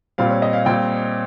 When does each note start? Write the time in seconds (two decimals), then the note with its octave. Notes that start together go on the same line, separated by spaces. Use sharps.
0.18 A#2 G3 C4 F5
0.30 C#5
0.42 D#5
0.53 F5
0.65 A#2 G3 C4 G5